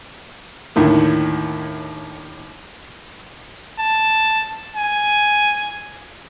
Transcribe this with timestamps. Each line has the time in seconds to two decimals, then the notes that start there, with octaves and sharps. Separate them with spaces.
0.76 D#2 A2 D3 D#3
3.79 A5
4.76 G#5